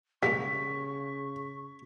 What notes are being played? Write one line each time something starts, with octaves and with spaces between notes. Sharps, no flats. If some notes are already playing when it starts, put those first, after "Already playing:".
C#3 G3 G#3 A#3 C#6 B6